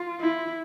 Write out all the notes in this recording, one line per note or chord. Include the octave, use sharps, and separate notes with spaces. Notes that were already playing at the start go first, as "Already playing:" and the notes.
Already playing: F4
E4